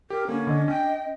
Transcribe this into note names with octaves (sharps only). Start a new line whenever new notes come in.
G4 A#4
D3 A#3 C#4
D3 D4 D#5
C#4 G5